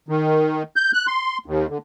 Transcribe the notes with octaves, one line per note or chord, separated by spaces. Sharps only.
D#3
G6
F#6
C6
D#2
D3